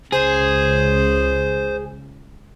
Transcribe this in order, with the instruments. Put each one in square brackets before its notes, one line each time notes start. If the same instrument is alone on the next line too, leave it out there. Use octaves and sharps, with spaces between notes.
[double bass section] C#2 C#3 [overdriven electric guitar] G#4 [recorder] C5